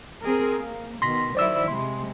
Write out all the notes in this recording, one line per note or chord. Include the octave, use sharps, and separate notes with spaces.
C4 G#4 A#4
A#3
B2 D#3 C6 A#6 B6
D#3 F#3 E4 C5 D5 E6
C3 G#3 C6